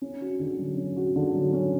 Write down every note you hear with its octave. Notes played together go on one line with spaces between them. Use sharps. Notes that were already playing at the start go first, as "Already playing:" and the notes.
C#4
F#4
D3
F#3
C#4
F#4
D3
F#3
C#4